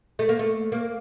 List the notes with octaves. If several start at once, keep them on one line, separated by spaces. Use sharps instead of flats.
A3
A#3
A3
A#3